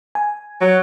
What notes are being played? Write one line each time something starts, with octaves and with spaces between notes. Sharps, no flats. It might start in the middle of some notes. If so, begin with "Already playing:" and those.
G#5
F#3